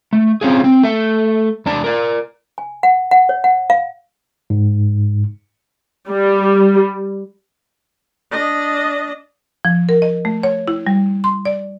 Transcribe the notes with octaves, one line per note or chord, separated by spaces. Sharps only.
A3
C4 C#4 F4 G#4
C4
A3 E5
E2 D4 A5
A#4 D5
G#5
F#5
F#5
C#5
F#5
F5
G#2
G3
D4 D#5
F3
A#4
D#5
A3
C#5
E4
G3
C6
D5